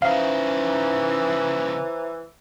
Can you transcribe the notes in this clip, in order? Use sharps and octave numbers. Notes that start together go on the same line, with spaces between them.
C#3 E3 D#4 C5 E5 F5 A#5